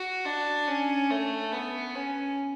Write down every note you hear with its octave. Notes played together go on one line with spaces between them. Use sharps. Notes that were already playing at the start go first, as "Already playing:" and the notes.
Already playing: F#4
D4
C#4
A3
B3
C#4